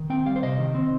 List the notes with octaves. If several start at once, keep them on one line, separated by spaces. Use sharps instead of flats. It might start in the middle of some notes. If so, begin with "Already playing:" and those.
Already playing: D#3
C4 G5
G3 F5
C5
C3 D#5
D#3
C4